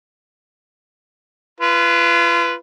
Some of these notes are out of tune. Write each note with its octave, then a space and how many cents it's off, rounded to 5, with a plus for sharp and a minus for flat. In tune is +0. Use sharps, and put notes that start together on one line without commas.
F4 -35 B4 +0